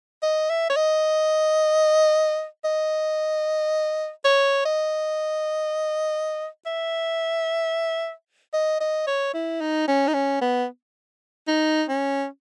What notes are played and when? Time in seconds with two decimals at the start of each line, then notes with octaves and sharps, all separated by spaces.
0.22 D#5
0.50 E5
0.69 C#5
0.76 D#5
2.64 D#5
4.25 C#5
4.66 D#5
6.66 E5
8.53 D#5
8.80 D#5
9.07 C#5
9.34 E4
9.61 D#4
9.88 C#4
10.08 D#4
10.14 C#4
10.41 B3
11.48 D#4
11.89 C#4